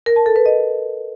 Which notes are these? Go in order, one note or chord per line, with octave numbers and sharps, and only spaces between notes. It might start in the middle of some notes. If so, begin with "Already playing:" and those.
A#4
A5
A4
B4
D#5